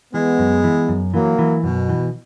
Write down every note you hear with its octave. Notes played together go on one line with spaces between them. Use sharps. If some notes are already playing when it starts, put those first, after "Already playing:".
E3 G#3 B3
F#2
E3
F#2
E3 F#3 A#3
E3
F#2 B2
E3